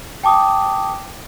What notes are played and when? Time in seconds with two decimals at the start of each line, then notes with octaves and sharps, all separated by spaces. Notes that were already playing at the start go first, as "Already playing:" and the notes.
0.23 G5 A5 D6 D#6